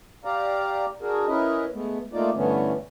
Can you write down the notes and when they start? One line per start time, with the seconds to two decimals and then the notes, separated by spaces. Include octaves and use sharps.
0.25 G4 D5 F5 A#5
1.02 D4 F#4 G#4 A#4
1.28 C#4 E4 A#4 B4 D#5
1.73 G#3 A3 B3
2.13 A3 A#3 D#4 F4 D5
2.35 G2 D3 E3 A3 B3 C#4